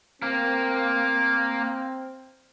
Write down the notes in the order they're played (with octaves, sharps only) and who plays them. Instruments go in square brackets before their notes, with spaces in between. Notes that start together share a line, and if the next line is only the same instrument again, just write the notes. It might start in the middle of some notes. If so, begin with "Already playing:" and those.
[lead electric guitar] A#3 A#4 [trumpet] C4